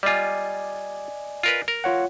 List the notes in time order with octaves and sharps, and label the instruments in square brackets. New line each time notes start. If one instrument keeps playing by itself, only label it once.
[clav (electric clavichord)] G3 F4 [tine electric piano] D5 D#5 G#5
[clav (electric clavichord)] F4 A#4 B4
A#4
[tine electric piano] F4 C#5 F#5